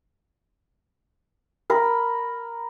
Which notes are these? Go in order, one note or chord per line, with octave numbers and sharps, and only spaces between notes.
A#4 B5